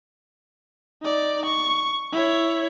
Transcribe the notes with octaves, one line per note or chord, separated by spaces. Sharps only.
D#4 D5
C#6
E4 C#5